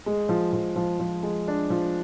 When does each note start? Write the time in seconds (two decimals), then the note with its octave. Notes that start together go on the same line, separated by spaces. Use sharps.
0.06 G#3
0.29 F3
0.53 F3
0.76 F3
0.99 F3
1.23 G#3
1.48 D4
1.70 F3